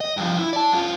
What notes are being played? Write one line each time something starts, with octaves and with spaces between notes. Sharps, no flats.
D#5
G2 F3
E4
D5 A5
F#2 F4